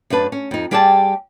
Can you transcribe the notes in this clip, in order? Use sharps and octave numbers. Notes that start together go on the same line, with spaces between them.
F#2 A3 D4 B4 A5
C#4
F2 D#4
G3 G4 G#4 D5 F#5 A5